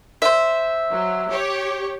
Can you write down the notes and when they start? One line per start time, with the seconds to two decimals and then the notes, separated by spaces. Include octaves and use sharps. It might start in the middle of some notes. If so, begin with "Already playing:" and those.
0.22 C5 E5
0.91 F#3
1.29 G4 C#5